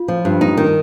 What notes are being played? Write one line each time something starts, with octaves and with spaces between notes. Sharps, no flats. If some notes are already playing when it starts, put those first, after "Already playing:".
Already playing: F4
F3
G2
D#4
D#3